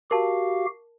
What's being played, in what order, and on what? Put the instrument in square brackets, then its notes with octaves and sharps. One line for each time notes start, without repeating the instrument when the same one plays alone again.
[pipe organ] F#4 G4 F5 [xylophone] A#4 A5